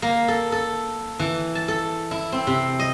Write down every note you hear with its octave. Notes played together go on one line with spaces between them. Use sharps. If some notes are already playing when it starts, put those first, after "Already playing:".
A#3
A4
A4
E3
A5
A4
E4
C4
C3
D#5